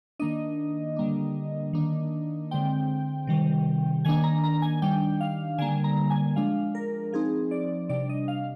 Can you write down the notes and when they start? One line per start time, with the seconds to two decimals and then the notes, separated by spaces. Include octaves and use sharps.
0.19 D#3 A#3 D4 D#5
0.96 D3 G3 A#3 D4
1.73 D#3 A#3 D4
2.51 D3 G#3 C4 G5
3.27 C3 D#3 G3
4.05 D#3 A#3 D4 G#5
4.24 A#5
4.44 A#5
4.62 G#5
4.82 D#3 G3 D4 G5
5.21 F5
5.58 D3 G3 A#3 G#5
5.84 A#5
6.10 G#5
6.36 F3 G#3 D4 F5
6.75 A#4
7.13 F3 C4 D#4 G#4
7.51 D5
7.89 C3 G3 D4 D5
8.09 D#5
8.28 F5